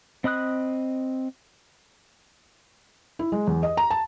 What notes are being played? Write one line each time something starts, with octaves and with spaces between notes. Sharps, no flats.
C4 D#5 B5 D#6 F#6
E4
G#3
E2
D#5
A#5
A5